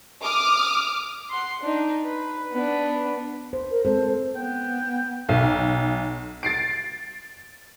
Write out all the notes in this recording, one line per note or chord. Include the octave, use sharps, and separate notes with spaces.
D6 D#6 F6
F#5 C6
D4 D#4
B4
B3 D4
C5
A#4
G#3 C4 A4 C5
B3 G5
B1
A6 C7 D7